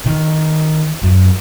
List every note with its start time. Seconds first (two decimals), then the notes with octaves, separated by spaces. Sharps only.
0.06 D#3
1.03 F#2